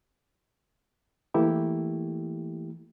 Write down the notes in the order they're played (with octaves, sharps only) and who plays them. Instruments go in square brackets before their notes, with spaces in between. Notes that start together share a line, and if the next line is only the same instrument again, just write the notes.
[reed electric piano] E3 A3 A#3 E4 G4